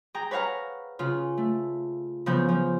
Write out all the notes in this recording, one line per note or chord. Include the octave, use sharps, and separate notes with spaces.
G#4 G5 A#5
B4 C#5 F5 F#5 A#5
C#3 F4
A3
C#3 F3 B3 G6
F3